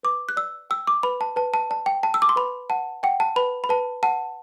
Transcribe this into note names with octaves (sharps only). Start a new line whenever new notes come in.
B4 D6
F#6
D5 E6
G5 E6
D6
B4 B5
A5
B4 A5
A5
D5 A5
G5
G5 A5
E6
D6
C6
B4 B5
F#5 A5
F#5 G5
A5
B4 B5
B5
B4 A5
F#5 A5